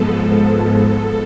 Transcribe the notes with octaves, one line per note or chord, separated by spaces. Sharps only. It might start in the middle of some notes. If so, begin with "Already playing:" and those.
Already playing: G#2 F3 G#3 B3 A4